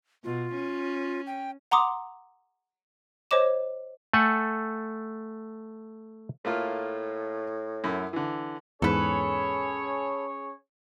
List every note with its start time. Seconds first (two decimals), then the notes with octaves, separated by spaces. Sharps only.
0.24 B2 F4
0.54 C#4
1.27 G5
1.71 F#5 A#5 C6 D6 D#6
3.31 C5 C#5 D#5 D6 E7
4.13 A3 A4 F#5 G#5
6.45 A2 A3 A#3 F4
7.84 F#2 E4
8.13 D3 E3
8.82 E2 G#2 C#4 G#4 A4 B4 C#5